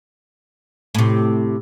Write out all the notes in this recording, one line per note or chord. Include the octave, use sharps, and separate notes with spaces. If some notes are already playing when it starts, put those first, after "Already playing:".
A2 C3